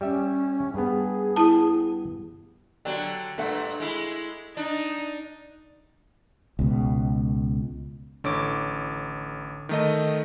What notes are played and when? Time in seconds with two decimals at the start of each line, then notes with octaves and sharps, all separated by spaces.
0.01 G3 C#4 G4 E5
0.74 G2 B3 G#4
1.36 E4 A5
2.85 D3 F#3 D4 G4
3.38 G2 A#2 A3 E5 F#5
3.80 G#3 E4
4.57 D4 D#4
6.59 C#2 B2
8.24 A1 D3 C#5 D6
9.69 D#3 A3 D#5